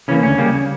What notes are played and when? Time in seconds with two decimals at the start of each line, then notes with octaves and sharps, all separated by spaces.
0.08 C#3 E3 A#3 C#4
0.23 D2 C#4
0.38 C#3 G3 A#3